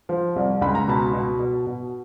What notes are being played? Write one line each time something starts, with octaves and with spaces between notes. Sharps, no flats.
F3
C2
C#2 B5
A#5
B2 A5 B5
B2
B2
B2